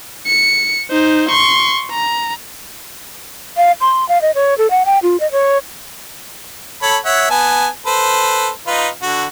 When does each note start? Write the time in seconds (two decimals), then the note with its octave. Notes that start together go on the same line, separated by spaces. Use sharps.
0.26 C#7
0.91 D#4 C5
1.29 C6 C#6
1.91 A#5
3.57 F5
3.81 C6
4.09 F5
4.22 D#5
4.35 C#5
4.58 A4
4.71 F#5
4.86 G5
5.03 F4
5.20 D#5
5.32 C#5
6.82 A4 C#5 B5
7.05 C#5 E5 F#5
7.30 B3 G#5 A5
7.86 A4 B4 C5
8.67 D#4 F4 B4
9.02 D3 F#4